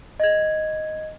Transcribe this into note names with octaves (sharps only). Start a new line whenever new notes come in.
D#5 G#6